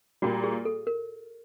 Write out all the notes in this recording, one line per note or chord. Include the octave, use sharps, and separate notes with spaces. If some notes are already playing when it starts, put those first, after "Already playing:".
A#2 G3 A#3 F#4
G#4
A4
A#4